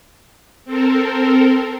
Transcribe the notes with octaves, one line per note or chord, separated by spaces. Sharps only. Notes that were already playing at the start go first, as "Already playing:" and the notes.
C4 A4 A#4